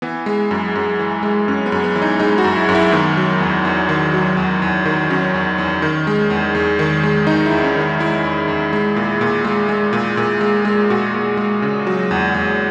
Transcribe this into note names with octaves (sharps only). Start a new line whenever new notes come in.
E3 B3
G#3
F#2
F#2
E3
G#3
F#2 C#4
B3
F#2
B3
E3
D#4
G#3 D#4
F#4
F#2
E4
F#2
E4
D#3 B3
F#3
E2
E2
D#3
F#3
E2
E2
D#3
F#3 C#4
E2
E2
D#3
G#3
E2
E2
D#3
G#3
E2 D#4
E2 E4
C#4
D#3 D#4
G#3 E4
E2
E2
G#3
A#2
A#2
G#3
G#3
A#2
A#2
G#3
G#3
A#2 F#4
A#2
G#3
C#3
F#3
E2
E2